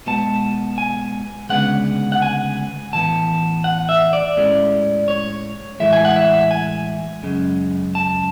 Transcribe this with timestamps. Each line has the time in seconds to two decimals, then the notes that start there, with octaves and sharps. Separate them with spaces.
0.06 B2 G#3 B3 A5
0.78 G#5
1.49 D2 C#3 G#3 B3 F#5
2.12 F#5
2.22 G#5
2.93 A2 E3 B3 A5
3.64 F#5
3.89 E5
4.13 D5
4.36 A2 G#3 C#4
5.08 C#5
5.80 A2 E3 G#3 E5
5.93 G#5
6.05 F#5
6.16 E5
6.51 G#5
7.23 F#2 C#3 G#3
7.95 A5